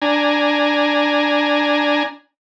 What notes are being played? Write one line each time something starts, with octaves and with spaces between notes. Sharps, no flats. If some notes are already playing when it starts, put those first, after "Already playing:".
D4 G#5 A#5